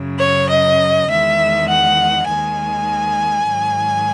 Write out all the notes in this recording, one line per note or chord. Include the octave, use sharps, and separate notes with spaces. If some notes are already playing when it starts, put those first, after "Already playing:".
Already playing: F#2 C#3 F#3
C#5
D#5
E2 D#3 G#3 E5
F#5
D#2 D#3 G#3 G#5
G#2 D#3 F#3